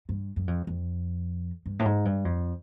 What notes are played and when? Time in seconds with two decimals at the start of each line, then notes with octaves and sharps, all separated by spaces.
0.09 G2
0.36 F#2
0.48 F2
0.67 F2
1.66 G2
1.79 A2
1.85 G#2
2.05 G2
2.25 F2